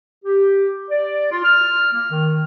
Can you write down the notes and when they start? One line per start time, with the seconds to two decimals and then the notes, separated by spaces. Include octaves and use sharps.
0.25 G4
0.90 D5
1.31 F4
1.44 F6
1.93 A#3
2.11 D#3